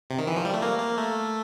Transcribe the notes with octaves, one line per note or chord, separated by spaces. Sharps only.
C3
D#3
E3
F3
G3
A3
A#3
A#3
A3